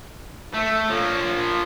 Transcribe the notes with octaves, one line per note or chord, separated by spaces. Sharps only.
A3 E5
F3 A#3 C#5